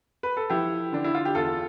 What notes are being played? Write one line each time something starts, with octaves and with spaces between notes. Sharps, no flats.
B4
A4
F3 E4 G4
D3 D4
E4
F4
G4
E2 F4 A4